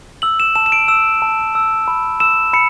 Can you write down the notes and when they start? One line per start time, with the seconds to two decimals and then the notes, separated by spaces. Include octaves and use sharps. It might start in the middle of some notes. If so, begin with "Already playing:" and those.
0.22 E6 F#7
0.40 E7
0.55 A5 E7
0.66 E7
0.72 D7
0.88 E6 E7
1.22 A5
1.55 E6
1.88 B5
2.20 E6 E7
2.53 B5 C#7